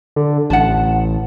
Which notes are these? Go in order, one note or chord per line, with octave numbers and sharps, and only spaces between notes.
D3
A1 F#5 A5